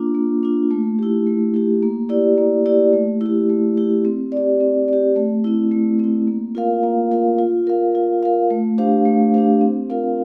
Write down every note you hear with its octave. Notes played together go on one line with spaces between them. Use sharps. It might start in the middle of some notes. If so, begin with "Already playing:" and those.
Already playing: A#3 D4 F4
A#3
D4 F4
A3
E4 G4
A3
E4 G4
A#3
E4 G4 D5
A#3
E4 G4 D5
A3
E4 G4
A3
E4 G4
C4
G4 D5
C4
G4 D5
A3
C4 E4
A3
C4 E4
A#3
F4 A#4 F5
A#3
F4 A#4 F5
F4
A#4 F5
F4
A#4 F5
A3
D4 G4 C5 F5
A3
D4 G4 C5 F5
C4
F4 A#4 F5